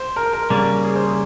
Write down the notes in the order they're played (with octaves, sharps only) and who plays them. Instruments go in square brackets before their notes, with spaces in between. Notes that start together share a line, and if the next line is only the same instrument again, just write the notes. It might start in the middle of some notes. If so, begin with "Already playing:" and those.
Already playing: [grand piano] C5
A#4
A#4
[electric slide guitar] C#3 G3 A#3 [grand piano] A#4
[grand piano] G#4
C5
G#4